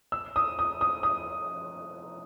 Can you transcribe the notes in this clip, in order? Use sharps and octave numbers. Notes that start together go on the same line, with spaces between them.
E6
D#6
D#6
D#6
D#6